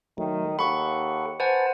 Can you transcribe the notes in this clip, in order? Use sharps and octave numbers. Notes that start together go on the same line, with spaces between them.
D#3 F#3 A3
D#2 A4 F#5 B5 C#6
B4 C5 F#5 G#5 A5